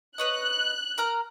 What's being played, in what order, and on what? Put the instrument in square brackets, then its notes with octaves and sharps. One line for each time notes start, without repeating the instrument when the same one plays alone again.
[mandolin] B4 C#5 D#5 [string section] F#6
[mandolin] A#4 A#5 F6